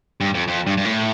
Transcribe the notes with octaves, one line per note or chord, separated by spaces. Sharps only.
G2
F2
F2
G2
G2
A2